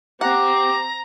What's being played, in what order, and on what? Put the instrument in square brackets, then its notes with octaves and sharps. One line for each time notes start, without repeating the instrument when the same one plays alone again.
[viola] C4 [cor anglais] G4 [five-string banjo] F#5 [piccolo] A#5